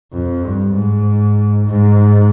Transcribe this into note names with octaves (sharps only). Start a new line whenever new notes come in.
F2
G2
G#2
G#2